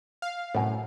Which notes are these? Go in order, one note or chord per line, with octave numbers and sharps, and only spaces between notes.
F5
C2 F#2 A2